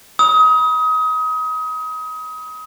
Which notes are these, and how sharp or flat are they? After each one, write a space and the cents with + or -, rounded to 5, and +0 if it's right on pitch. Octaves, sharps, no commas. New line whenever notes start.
B5 -25 D#6 +30